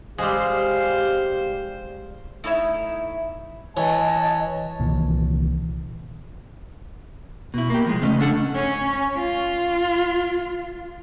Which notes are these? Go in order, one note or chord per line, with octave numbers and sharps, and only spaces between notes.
G#2 C3 G3 G#3 G4 C5 F5
A3 D#4 E4 C#5 E5
E3 C#5 D#5 A5
C2 A#2 D#3 E3
B2 E4
A#3 G4
C2 F3 G#3
C#3 A3 C#4 D#5
D4 A4 F#5
C#4
F4